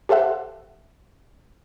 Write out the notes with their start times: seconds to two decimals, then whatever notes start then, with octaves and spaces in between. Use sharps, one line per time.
0.09 G4 A4 C5 E5 F#5